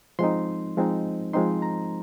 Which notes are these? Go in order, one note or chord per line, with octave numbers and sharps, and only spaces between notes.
F3 G#3 C4 D#4 C6
F3 G#3 C4 D#4
F3 G#3 C4 D#4 C6
A#5